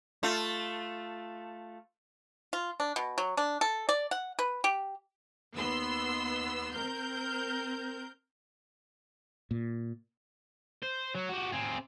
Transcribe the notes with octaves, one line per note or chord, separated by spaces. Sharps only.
A3 F4
F4
D4
B2
F#3
D4
A4
D5
F#5
B4
G4
D#2 B3 C6 E6
C4 A#4 G6
A#2
C5
F#3
F#4 G4
C4 G#4